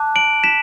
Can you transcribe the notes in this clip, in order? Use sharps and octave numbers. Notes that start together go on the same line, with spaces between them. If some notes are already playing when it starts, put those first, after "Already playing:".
Already playing: A5 D6 F#6
D7 F#7
B6 E7